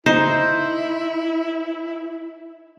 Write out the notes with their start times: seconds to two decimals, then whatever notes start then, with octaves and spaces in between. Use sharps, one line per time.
0.06 D#4 E4 C5